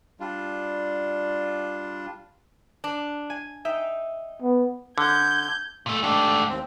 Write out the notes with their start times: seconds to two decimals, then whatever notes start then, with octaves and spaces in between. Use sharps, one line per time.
0.20 G3 D4 F4
2.84 D4
3.30 G#5
3.65 D#4 E5 G5
4.42 B3
4.98 D3 G6 G#6
5.86 A#2 A3
6.03 G#2 A3 D4 G4
6.49 D#2 C4